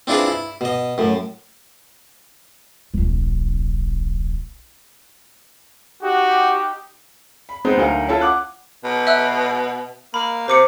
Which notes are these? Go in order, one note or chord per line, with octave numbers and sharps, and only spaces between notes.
C4 D4 E4 F4 G#4 B4
E4
B2 D#5
F#2 A2
D1 A#1
D#4 F#4 G4
B5
G#3 B3 C4 D#4 C5
D2 F#3 D#4 A#4 F5
C#4 E4 F4 A4
F#5 D6 F#6
B2
E5 E6 F#6
A#3 B5
C3 C5 D6 C#7